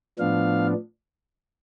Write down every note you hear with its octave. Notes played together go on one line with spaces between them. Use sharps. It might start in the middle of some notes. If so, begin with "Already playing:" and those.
A2 F3 B3 D4 F5